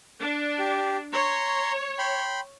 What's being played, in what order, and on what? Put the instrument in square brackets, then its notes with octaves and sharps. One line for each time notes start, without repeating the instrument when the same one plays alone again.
[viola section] D4
[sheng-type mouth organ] G4
[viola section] C#5 [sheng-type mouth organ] A#5 C6
[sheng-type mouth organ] G5 B5 C6